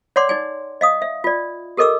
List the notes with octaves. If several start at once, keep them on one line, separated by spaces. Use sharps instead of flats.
C#5 D5 F#5 C6 D6
D#4 D5 G#5
D#5 F5 D#6
E5
F4 D5
G4 A4 A#4 D#5 D6 E6